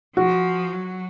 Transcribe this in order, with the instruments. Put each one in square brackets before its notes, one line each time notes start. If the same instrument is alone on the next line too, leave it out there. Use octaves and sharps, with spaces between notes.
[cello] F3 [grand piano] F#4
[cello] F#3